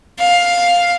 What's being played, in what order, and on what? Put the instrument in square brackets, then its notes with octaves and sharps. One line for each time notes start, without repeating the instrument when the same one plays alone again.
[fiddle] F5